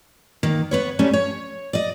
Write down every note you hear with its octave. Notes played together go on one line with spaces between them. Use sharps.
D#3 A#3
B3 B4 C#5
F#3 G3 A3 C#4
C#5
D5 D#5